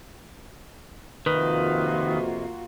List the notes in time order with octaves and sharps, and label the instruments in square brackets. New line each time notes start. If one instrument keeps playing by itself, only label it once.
[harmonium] F2 C3 [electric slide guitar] D#3 [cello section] A#3 F4 F#4 [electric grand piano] B4